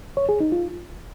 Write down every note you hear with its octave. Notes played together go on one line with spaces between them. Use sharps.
C#5
G#4
D#4
F4